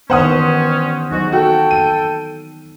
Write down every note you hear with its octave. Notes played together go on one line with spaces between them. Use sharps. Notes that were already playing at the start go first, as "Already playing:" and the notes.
G2 D#3 E3 B3 C#4 C5 F#5 D#6
G#2 F#3 D#4 F#4
F#4 A4 G5
D#7